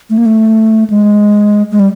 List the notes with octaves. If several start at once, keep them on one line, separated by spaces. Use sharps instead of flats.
A3
A#3
A3
G#3
G#3
G3